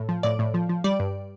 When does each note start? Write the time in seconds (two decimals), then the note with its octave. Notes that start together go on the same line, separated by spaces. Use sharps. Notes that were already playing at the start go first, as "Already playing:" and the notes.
Already playing: A2
0.09 F3
0.23 A2 D5
0.39 A2
0.54 F3
0.69 F3
0.84 G3 D5
1.00 G2